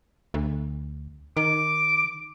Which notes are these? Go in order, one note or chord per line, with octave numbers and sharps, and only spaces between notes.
D2
D#3 D6